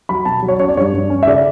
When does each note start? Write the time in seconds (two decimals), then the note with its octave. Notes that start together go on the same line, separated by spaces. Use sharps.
0.09 F#3 B5
0.25 B2 A5
0.42 F#3
0.48 C#5
0.59 C#4 C#5
0.69 D5
0.77 G2 C#5
0.94 G2
1.10 C#4
1.23 E5
1.27 C#3 D5